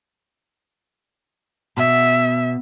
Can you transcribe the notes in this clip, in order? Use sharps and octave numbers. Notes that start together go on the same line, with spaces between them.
B2 E5